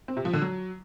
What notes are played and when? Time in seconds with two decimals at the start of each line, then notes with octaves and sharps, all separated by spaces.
0.08 C4
0.17 C3
0.25 F3
0.33 D3
0.42 F#3